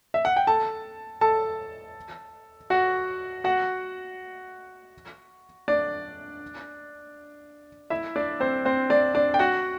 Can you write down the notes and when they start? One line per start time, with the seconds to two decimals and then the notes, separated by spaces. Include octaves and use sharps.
0.14 E5
0.25 F#5
0.37 G5
0.47 A4 A5
1.21 A4 A5
2.70 F#4 F#5
3.44 F#4 F#5
5.68 D4 D5
7.90 E4 E5
8.16 D4 D5
8.40 C4 C5
8.65 C4 C5
8.90 D4 D5
9.15 D4 D5
9.34 G5
9.39 F#4 F#5